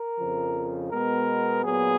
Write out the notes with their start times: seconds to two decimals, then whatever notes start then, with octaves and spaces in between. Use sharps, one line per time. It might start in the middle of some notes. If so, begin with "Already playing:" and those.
Already playing: A#4
0.18 F2 C#3 F3
0.91 B2 G#3 B3 A#4
1.64 A#2 F#3 B3 G#4